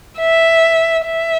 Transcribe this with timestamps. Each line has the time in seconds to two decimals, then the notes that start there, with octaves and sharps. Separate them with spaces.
0.19 E5
1.06 E5